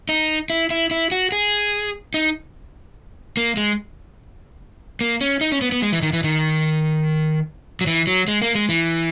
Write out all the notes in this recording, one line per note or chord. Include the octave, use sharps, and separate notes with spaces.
D#4
E4
E4
E4
F#4
G#4
D#4
A#3
G#3
A#3
C#4
D#4
C#4
B3
B3
G#3
E3
D#3
E3
D#3
F#3
E3
F#3
G#3
A#3
G#3
E3